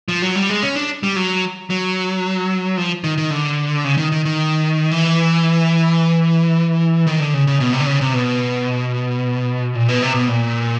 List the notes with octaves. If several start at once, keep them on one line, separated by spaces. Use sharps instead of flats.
F3
F#3
G3
G#3
C#4
D4
G3
F#3
F#3
F3
D#3
D#3
D3
C#3
D#3
D#3
D#3
E3
D#3
D3
C#3
C#3
B2
C3
D3
C#3
C3
B2
A#2
B2
C3
B2
A#2